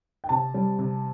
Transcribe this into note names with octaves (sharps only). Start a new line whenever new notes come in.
G5
C3 A5
G3
C3